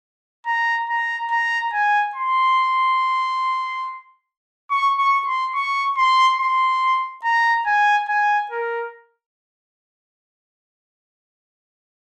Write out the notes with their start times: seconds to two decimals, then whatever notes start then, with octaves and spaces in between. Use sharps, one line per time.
0.47 A#5
0.89 A#5
1.31 A#5
1.73 G#5
2.16 C6
4.71 C#6
4.99 C#6
5.27 C6
5.55 C#6
5.97 C6
6.40 C6
7.24 A#5
7.67 G#5
8.09 G#5
8.51 A#4